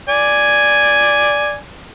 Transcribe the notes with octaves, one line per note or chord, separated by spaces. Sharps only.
D5 G#5